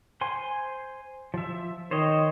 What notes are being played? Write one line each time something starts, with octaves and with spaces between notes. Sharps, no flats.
C5 G#5 C6
F3 E5
D#3 C5 C#5 D#5